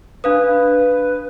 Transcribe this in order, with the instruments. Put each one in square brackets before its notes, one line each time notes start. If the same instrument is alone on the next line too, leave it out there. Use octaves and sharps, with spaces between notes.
[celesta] D4 F5 D#6 [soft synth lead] B4